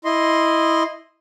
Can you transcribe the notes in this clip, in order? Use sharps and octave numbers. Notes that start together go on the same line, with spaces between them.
E4 D#5 C6